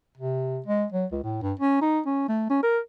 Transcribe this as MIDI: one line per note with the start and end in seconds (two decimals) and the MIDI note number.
0.17 0.60 48
0.66 0.85 56
0.92 1.05 54
1.12 1.20 37
1.23 1.38 45
1.42 1.53 43
1.59 1.79 61
1.81 2.00 63
2.06 2.28 61
2.29 2.48 57
2.50 2.61 61
2.63 2.79 70